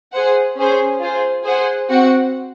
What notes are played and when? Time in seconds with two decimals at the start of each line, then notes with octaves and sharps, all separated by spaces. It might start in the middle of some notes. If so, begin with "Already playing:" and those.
0.12 G#4 C5 F#5
0.57 C#4 G#4 C5
1.01 F4 G#4 C5
1.45 G#4 C5 F#5
1.89 C4 F#4 C5 F#5